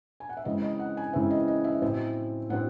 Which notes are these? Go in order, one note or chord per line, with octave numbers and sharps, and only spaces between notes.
G#5
F#5
E5
C#3 E3 G#3 C4 D#5
D#5
F#5
G#5
C#3 E3 G#3 C4 E5
D#5
D#5
E5
A2 F#3 C4 E5
A2 F#3 C4 F#5